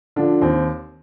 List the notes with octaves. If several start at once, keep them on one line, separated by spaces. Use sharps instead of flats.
D3 F3 D4
D#2 C4